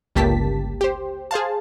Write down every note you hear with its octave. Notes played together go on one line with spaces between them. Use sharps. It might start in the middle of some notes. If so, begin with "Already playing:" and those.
G1 C#2 A#3 G4 A5 B6
G4 C5
G#4 C5 F5 A5